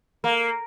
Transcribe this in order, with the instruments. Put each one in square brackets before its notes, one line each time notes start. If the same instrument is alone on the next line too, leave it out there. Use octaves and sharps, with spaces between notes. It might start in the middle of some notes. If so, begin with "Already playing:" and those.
[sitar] A#3